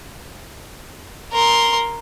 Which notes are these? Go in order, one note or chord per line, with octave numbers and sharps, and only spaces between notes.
A#4 C6